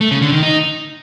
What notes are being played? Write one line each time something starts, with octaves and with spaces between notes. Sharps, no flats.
A3
C#3
D3
D#3
D#4